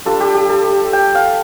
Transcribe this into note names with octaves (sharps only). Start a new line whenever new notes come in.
G3 D4 F4 A4
G4
G4
A4
G5
F5